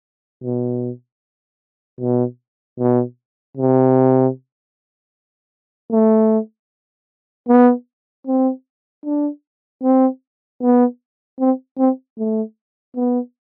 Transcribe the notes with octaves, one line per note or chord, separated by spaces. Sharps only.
B2
B2
B2
C3
A3
B3
C4
D4
C4
B3
C4
C4
A3
B3